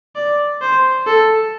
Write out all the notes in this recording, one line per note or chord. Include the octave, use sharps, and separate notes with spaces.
D5
C5
A4